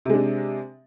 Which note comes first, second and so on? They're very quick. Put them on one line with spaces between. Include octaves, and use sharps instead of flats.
C3 G#3 D4